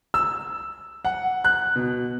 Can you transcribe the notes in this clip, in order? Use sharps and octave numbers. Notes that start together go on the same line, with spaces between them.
E6
F#5
F#6
B2